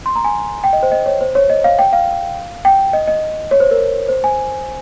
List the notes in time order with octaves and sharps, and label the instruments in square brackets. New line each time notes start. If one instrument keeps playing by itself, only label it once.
[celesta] C6
A#5
G#5
G5
D#5
C5
D#5
C#5
C5
C#5
D#5
F5
G5
F5
G5
D#5
D#5
C#5
C5
A#4
C5
G#5